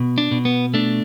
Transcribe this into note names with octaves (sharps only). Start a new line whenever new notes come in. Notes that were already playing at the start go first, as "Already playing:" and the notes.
Already playing: B2
D4
B2
B3
A3 D4